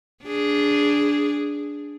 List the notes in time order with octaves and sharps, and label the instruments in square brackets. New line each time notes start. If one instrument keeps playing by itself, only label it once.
[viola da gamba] D4 G#4